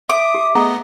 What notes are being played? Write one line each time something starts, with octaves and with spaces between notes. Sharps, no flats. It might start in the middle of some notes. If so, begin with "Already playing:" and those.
E5 D6 D#6
G4
A3 B3 G#4 D#5 F#5 A#5 D#6